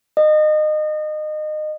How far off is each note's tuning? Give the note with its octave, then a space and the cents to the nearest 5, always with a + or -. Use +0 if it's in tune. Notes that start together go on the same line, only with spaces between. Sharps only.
D#5 -25